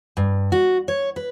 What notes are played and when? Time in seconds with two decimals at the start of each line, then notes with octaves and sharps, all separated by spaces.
0.17 G2
0.52 F#4
0.88 C#5
1.16 B4